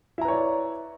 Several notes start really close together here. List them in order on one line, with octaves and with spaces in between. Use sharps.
E4 A#5 B4 C#5 D5